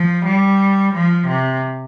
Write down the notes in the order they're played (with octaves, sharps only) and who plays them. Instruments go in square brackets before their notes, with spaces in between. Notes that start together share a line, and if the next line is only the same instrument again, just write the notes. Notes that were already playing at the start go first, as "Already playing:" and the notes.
Already playing: [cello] F3
G3
F3
C3